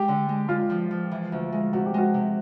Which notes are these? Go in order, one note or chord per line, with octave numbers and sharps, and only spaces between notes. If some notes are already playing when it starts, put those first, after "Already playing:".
Already playing: G#3 G4
D3
G#3
G#3 F4
F3
F3
E3
D2
G#3
C3 F#4
G4
G#3 F#4
C3